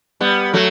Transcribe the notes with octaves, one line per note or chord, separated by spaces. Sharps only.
G3 B3
F#3 A3